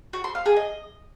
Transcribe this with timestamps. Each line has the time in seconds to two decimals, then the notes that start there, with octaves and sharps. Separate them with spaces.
0.13 F#4
0.24 C6
0.35 F5
0.46 G#4
0.56 D#5